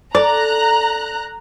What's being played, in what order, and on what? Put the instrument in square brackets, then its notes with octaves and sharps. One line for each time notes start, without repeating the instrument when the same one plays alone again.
[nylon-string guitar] A4 [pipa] D5 [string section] A#5 F#6